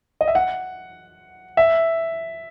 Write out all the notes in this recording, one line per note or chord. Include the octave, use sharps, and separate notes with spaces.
D#5
E5
F#5
E5